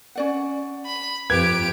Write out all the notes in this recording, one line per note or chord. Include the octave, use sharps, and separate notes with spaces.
C#4 D5 F#5
B5
F2 G4 B4 G#6 D7